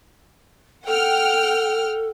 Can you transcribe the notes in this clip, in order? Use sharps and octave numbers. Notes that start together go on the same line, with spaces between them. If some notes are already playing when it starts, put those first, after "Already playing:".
A4 F#5 G5 F6